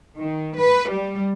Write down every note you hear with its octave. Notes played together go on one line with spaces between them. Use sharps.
D#3
B4
G3